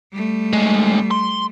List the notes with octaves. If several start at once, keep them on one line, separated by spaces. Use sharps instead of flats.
G3 A3
D#2 G#3
C6